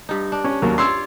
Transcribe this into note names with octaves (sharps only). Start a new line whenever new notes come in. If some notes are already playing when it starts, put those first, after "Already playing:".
G2 D#4
D4
C#4
D#2 F#3 A#4
F4 C#5 D5 C6 E6